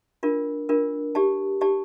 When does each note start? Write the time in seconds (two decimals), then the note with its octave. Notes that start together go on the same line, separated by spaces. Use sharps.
0.23 D4 F4 A#4
0.69 D4 F4 A#4
1.15 G4 D5 A5
1.61 G4 D5 A5